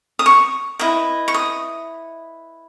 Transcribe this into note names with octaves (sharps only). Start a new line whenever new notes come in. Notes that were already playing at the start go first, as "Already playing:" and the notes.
D#6
C#6
E4 B4 D#5
C#6
D#6